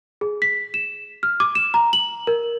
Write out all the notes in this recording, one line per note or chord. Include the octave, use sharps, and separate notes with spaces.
G#4
B6
E7
F6
D6
E7
A#5
F#7
A#4